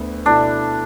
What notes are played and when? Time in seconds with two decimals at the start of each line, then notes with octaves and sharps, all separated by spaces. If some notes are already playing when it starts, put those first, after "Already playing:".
Already playing: D2 D3 B3
0.26 B2 A3 D4 E4